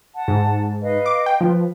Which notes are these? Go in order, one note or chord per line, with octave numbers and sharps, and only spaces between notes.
F#5 A5
G#2
B4 D#5 F5
D6
G5
F3 B4